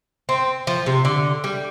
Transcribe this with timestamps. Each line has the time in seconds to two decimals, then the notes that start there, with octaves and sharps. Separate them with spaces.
0.29 C4
0.67 F3
0.86 C3
1.05 D3
1.44 G3